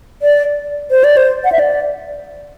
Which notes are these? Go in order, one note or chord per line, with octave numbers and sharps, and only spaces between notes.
D5
C5
D5
C5
F#5
E5
D5